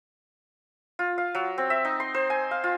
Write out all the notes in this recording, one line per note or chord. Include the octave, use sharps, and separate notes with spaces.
F4
F5
F#3
C4
E5
D#4
C6
C5
G#5
F5
F4